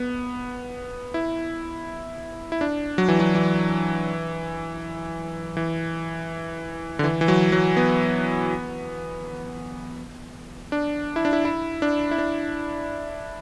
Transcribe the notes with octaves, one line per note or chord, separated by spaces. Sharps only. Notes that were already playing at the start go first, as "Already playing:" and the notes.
Already playing: B3
E4
E4
D4
F#3
E3
F#3
E3
E3
D3
E3
E3
F#3
F#3
B3
D4
E4
D4
E4
E4
D4
E4
D4